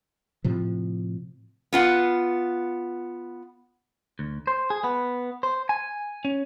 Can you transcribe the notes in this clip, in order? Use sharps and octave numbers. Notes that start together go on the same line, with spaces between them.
A2 C3 F3
B3 F4 F#5
D2
C5
G#4
B3
C5
G#5
C#4